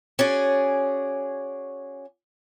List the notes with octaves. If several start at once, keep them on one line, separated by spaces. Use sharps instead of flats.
C#4 F#4 G#4 C#5 D5